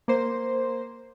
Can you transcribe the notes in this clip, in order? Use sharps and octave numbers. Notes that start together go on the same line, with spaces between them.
A#3 C5